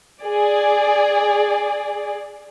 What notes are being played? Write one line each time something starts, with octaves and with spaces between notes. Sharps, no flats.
G#4 D5